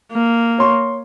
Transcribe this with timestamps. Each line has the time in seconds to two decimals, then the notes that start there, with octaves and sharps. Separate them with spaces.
0.12 A#3
0.58 C#5 C6 C#6